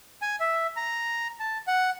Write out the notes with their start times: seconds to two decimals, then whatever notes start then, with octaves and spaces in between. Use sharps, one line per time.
0.22 G#5
0.40 E5
0.76 A#5
1.40 A5
1.67 F#5